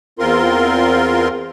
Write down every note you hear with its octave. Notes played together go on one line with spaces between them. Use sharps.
E2 C4 F4 A#4 C6